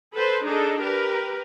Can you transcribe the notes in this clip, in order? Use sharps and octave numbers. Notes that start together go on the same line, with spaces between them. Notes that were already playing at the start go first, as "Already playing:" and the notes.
A4 B4 C5
D4 D#4 G#4 A4
G4 A#4 B4